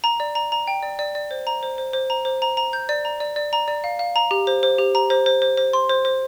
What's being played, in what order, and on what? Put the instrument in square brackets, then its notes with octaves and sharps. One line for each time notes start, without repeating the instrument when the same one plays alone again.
[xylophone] A#5
D5
A#5
A#5
G5
D5
D5
D5
C5
A#5
C5
C5
C5
A#5
C5
A#5
A#5
G6
D5
A#5
D5
D5
A#5
D5
F5
F5
A#5
G4
C5
C5
G4
A#5
C5
C5
C5
C5
C6
C5
C5